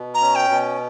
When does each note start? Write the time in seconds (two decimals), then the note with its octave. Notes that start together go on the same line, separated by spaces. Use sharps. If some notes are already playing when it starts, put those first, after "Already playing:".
Already playing: B2
0.14 A#5
0.22 C#4
0.35 G5
0.50 B2